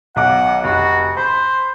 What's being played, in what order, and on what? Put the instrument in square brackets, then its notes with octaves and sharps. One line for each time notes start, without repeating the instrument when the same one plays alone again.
[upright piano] B1 D6 [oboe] F#5
[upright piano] F1 [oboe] F#4
[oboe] C5 [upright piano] B5